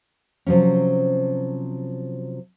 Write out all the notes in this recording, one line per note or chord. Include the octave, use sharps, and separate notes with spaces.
C3 F3 F#3 C#4